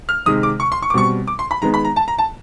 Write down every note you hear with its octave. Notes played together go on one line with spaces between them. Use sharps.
F6
C3 D#3 G#3 D#6
D6
C#6
C6
C#6
D6
B2 G3 C4 C#6
D6
C6
B5
D#3 G#3 B3 A#5
B5
A#5
A5
A#5
A5